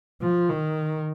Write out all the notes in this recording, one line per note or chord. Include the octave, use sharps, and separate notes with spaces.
F3
D#3